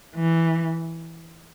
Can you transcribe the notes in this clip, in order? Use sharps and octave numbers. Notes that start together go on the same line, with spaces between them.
E3